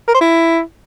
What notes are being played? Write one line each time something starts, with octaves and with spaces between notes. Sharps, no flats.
A#4
C5
E4